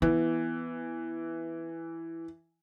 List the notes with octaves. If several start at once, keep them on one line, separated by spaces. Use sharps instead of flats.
E3 B3